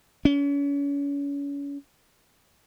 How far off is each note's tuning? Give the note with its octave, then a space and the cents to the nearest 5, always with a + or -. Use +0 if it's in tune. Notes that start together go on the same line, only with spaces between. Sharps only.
C#4 +35